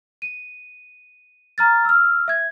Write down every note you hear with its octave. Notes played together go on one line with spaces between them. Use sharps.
D#7
A#5 F6 A6
E6 F6
E5 G#6